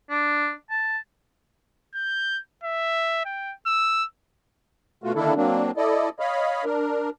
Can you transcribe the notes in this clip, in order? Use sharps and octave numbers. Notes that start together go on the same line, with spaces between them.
D4
A5
G6
E5
G5
E6
B2 A3 F4 F#4
D3 D#3 A#3 D4 E4 A4
F#3 A#3 C4 D4
E4 A4 D5 D#5
C#5 D#5 F5 B5
D4 A#4